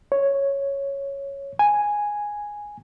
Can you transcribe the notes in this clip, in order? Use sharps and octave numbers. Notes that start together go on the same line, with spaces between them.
C#5
G#5